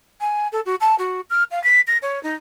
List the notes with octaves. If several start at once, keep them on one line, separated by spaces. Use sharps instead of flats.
G#5
A4
F#4
A5
F#4
F6
F5
B6
A#6
C#5
D#4